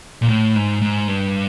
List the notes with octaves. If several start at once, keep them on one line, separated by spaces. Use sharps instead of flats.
A#2
A2
G#2
G#2
G2